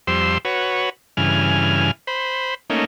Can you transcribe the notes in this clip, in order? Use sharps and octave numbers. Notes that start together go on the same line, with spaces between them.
F2 G3 C5 C6 E6
F#4 B4 C#5
G2 C#3 E3 G#5 F6
C5 B5
A3 A#3 C#4 D#4